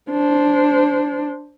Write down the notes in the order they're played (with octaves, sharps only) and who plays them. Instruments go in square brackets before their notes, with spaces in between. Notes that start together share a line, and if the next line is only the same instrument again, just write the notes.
[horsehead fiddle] D4 C5